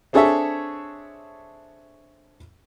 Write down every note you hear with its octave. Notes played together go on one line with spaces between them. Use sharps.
C4 D4 G#4 A4 C#5 E5